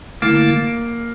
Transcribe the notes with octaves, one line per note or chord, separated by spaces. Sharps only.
D3 A3 A#3 E4